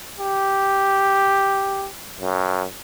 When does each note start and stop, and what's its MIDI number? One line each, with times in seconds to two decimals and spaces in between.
0.19 1.88 67
2.21 2.65 42